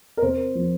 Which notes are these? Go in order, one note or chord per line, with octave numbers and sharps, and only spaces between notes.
A#4
C3 C5
F3